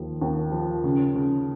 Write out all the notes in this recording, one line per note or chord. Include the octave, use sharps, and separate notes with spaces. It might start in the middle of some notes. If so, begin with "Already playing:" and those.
Already playing: D#2 F3
D#2
F3
C#3
C#3